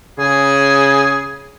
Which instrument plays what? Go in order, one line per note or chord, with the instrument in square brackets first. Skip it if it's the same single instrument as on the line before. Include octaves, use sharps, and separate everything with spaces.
[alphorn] C#3 [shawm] G#4